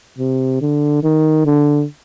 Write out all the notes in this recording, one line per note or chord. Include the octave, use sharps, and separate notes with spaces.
C3
D3
D#3
D3